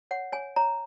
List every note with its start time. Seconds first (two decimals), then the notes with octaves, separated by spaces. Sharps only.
0.11 C#5 F#5
0.32 C#5 G#5
0.56 C#5 A#5